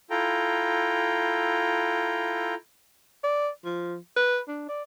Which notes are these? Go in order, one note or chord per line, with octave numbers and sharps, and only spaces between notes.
E4 F4 A4 G5 A#5
D5
F3
B4
D4
D5